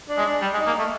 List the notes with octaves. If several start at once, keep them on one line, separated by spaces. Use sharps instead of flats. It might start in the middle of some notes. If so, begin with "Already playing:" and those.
D4
G#3
D4
G3
G#3
D#4
A#3
A3